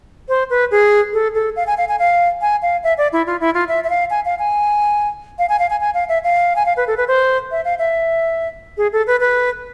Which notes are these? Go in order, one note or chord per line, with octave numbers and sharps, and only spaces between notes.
C5
B4
G#4
A4
A4
F5
G#5
F5
G#5
F5
G#5
F5
E5
D5
E4
F4
E4
F4
E5
E5
F5
G#5
F5
G#5
F5
G#5
F5
G#5
G#5
F5
E5
F5
G#5
F5
B4
A4
B4
C5
E5
F5
E5
G#4
A4
B4
B4